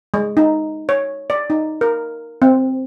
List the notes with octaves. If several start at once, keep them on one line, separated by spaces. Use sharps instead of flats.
G#3
D#4
C#5
D5
D#4
A#4
C4